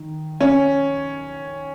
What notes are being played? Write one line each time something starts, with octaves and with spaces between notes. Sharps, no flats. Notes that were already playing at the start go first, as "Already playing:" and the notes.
Already playing: D#3
C#4